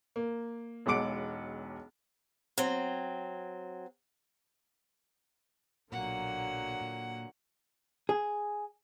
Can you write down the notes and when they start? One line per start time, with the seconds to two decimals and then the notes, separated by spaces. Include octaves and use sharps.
0.16 A#3
0.86 E1 B1 G#3 F#5 D6 D7
2.58 F#3 C4
5.92 B1 A#2 D3 F#3 A#3 F#5
6.81 A#2
8.09 G#4